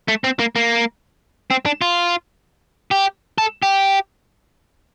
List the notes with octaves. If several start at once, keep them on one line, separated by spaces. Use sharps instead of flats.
A3
C4
A#3
A#3
C4
D4
F4
G4
A4
G4